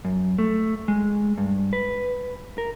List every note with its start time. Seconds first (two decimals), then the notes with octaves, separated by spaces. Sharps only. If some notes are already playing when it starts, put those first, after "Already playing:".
0.04 F#2
0.38 A3
0.88 G#3
1.38 G2
1.73 B4
2.58 A#4